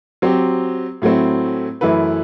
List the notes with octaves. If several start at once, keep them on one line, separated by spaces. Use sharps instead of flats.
F#3 C4 G4
A2 F#3 A3 C4
F#2 E3 A3 E4 B4